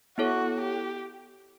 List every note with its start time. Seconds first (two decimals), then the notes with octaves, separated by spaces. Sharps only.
0.18 B3 E4 F#4 A4 C#5
0.61 G4